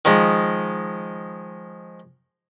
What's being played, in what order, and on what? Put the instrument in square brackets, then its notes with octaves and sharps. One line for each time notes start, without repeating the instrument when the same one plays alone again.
[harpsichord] D#3 F3 G#3